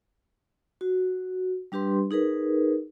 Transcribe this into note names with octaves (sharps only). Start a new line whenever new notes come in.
F#4
G3 D4 G4 B4 C6
D#4 G#4 A#4 B4